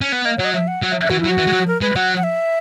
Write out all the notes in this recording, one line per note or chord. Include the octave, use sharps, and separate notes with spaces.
C#4
B3
A#3 D#5
F#3 C#5
D#5
E5
F#5
F#3
E5
E5
E3 F#4
E4
F#3
F#4
E3
G#3
F#3
A#4
G#3 B4
F#3 F#5
F#5
E5